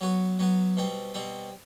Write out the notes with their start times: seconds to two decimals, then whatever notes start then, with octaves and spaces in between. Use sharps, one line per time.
0.01 F#3 B3 F#4
0.39 F#3 B3 F#4
0.77 B2 G3 C4
1.14 B2 G3 C4